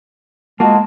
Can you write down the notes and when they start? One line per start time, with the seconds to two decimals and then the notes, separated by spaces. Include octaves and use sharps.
0.60 G#3 A#3 F4 F#4 A5